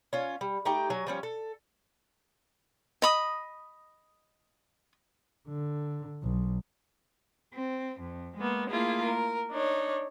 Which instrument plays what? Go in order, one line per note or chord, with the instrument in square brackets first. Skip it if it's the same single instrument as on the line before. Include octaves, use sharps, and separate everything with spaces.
[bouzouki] C#4 F4
G3
A3 D#4 G4 G5
F#3 G#5
F3 G3 C#4
A4
[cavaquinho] D#5 B5 D#6
[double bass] D3
B1
[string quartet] C4
F2
G#3 A#3 B3
A3 A#3 E4 F4 G#4
A#4
D4 D#4 C#5